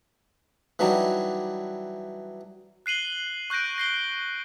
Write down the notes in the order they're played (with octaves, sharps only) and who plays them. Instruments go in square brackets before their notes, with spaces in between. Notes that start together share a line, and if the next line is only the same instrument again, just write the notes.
[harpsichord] E3 F#3 G3 D4 D#4
[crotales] F#6 C7 D#7 F#7 G7
C#6 F#6 G6 A#6 D7
A#6 C7 G7